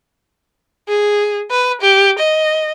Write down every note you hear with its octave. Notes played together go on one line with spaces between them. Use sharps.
G#4
B4
G4
D#5